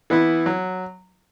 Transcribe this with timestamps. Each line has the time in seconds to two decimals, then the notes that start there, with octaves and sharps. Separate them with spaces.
0.10 E3 B3 E4
0.46 F#3